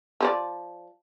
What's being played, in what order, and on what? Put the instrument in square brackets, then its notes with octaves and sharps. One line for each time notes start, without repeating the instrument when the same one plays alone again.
[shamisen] F3 C5 D5